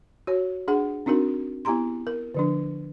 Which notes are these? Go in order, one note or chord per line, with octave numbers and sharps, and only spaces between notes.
F#4 C#5
D4 G#4 F#5
C4 D4 D#4 F#4 A#4
B3 E4 G4 A#5 C6
A#4
D3 F3 D4